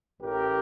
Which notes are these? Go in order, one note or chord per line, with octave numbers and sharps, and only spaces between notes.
A1 A2 G4 A#4